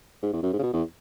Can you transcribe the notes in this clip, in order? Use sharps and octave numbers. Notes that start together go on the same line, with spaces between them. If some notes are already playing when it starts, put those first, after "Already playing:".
G#2
E2
F#2
G#2
C#3
B2
E2